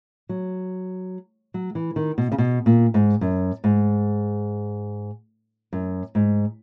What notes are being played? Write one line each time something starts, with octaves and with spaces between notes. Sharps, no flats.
F#3
F#3
E3
D#3
B2
C#3
B2
A#2
G#2
F#2
G#2
F#2
G#2